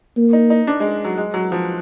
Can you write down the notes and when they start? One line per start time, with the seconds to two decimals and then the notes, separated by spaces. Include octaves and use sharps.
0.17 A#3
0.33 D#4
0.50 D#4
0.67 D4
0.80 G#3
1.05 F#3
1.17 G#3
1.34 F#3
1.52 F3